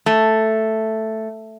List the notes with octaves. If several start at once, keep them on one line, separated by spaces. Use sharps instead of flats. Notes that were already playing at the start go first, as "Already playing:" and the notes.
A3